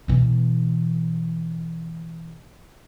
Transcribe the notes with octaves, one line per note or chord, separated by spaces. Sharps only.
B2 E3